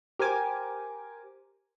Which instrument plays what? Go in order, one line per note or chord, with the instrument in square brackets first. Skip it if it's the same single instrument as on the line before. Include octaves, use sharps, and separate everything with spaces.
[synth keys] G4 A#4 C5 G#5 D6